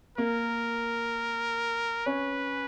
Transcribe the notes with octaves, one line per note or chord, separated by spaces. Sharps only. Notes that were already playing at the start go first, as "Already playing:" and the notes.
A#3 A#4
C#4 B4